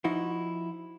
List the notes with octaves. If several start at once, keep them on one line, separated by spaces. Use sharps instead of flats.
F3 D#4 E4 F#4